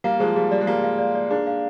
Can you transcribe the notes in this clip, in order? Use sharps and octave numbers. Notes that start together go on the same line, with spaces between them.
G3 A#3 F5
F3 G#3 G#4
G3 G#4
G3 D5
G#3
G3 A#3 D5
F5
D5
D5
A#3 D4 G#4
F5